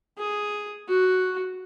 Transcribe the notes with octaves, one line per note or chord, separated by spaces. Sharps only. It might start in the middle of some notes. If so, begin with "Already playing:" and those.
G#4
F#4